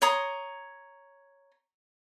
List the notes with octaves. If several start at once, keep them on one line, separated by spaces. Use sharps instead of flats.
C#5 A#5 C6 D#6